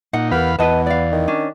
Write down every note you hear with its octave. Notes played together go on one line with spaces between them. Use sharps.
A#2 D#4 F#5
E2 B3 G4 A#4 F5 B5
E2 B3 B4 D#5 A5
D5 F5
D#3
C#4 D4